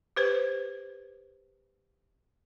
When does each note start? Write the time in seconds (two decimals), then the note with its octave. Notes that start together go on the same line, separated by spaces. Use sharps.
0.16 G4 B4 C5